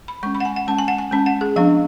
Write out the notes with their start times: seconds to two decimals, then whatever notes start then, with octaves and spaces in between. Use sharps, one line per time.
0.08 B5
0.23 G#3 C#4 C#6
0.35 B5
0.40 F#5
0.45 G#5
0.56 F#5
0.68 G#3 C#4 A5
0.78 G#5
0.88 F#5
0.98 G#5
1.11 G#3 C#4 A5
1.26 F#5
1.41 G#4
1.56 F3 B3 D4 F5